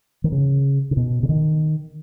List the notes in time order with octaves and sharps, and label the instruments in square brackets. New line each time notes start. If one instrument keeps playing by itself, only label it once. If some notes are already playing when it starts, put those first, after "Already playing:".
[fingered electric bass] D#3
C#3
C#3
B2
C#3
D#3